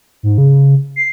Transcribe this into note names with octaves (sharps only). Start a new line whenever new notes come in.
G#2
C#3
C7